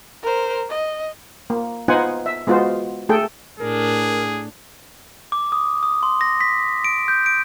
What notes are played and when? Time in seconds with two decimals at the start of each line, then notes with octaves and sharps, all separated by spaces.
0.23 A#4 C5
0.69 D#5
1.50 A#3
1.88 B3 D#4 F4 C5 F#5 G#5
2.26 E5
2.47 G#3 B3 F4 F#4 C5
3.09 A3 G#4 A4 G5
3.60 A2 D4 G#4 A#4
5.32 D6
5.52 D#6
5.83 D#6
6.03 C6
6.21 A#6
6.41 B6
6.84 D7
7.08 G6
7.26 D7